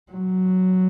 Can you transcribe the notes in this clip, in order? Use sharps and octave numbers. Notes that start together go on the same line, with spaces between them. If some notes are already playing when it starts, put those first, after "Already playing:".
F#3